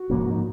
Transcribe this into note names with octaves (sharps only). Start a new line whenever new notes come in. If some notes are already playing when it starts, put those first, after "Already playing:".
Already playing: F#4
G#2 F3 A#3 C#4
D#4